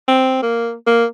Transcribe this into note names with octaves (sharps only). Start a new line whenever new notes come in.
C4
A#3
A#3